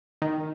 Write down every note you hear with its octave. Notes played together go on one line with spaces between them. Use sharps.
D#3